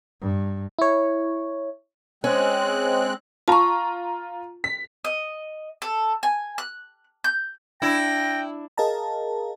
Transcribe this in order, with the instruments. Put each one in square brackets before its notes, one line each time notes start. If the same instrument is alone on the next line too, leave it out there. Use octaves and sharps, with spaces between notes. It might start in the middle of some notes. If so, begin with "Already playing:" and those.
[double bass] G2
[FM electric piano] E4 C#5
[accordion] G#3 C4 F#6 [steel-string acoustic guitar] C#4
[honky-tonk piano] F4 A#5 [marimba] A5 C#6
[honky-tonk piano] B6
[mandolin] D#5
A4
G#5
F#6
G6
[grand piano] D4 [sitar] E4 [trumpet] G5 [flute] A#6
[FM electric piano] G#4 A#4 D#5 F5 A5 A#5